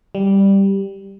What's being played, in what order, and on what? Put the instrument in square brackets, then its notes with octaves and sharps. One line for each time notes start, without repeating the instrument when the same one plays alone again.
[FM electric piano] G3